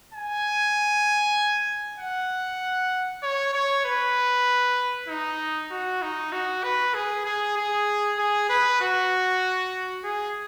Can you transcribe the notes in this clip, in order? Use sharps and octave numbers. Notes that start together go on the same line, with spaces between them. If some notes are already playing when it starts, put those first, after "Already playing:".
G#5
F#5
C#5
C#5
B4
D#4
F#4
D#4
F#4
B4
G#4
G#4
G#4
G#4
B4
F#4
G#4